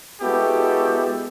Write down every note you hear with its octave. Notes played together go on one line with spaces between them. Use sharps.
G#3 B3 E4 F#4 G4 A4